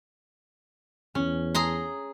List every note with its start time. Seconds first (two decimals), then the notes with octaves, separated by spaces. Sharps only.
1.15 E2 C#4
1.55 G#4 A#5 C6